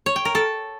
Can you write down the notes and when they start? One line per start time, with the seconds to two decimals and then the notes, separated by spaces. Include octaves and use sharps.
0.06 C#5
0.16 G5
0.25 A#4
0.35 A4